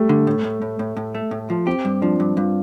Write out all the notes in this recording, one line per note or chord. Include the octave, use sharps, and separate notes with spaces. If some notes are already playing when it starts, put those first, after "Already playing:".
Already playing: G3 A3
D3
A2
A2
A2
A2
A2
A3
A2
F3
C4 G4
G2
F3 D4
G2
G2 F4